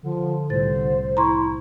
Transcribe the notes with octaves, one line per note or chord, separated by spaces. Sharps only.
D3 F3
C2 A2 C5 A6
E4 A#5 C6 C#6